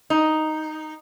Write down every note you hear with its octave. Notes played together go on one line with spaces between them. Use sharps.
D#4